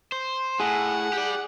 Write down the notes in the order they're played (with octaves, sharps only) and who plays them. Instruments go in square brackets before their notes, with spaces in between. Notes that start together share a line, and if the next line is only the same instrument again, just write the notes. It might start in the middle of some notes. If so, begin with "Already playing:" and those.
[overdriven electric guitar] C5
[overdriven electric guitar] A2 [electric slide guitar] G#4 [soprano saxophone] F#5
[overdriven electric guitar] G4 D5